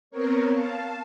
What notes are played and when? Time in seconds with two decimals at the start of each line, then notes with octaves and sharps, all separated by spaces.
0.11 B3 C4 A#4 C#5
0.51 F5 A5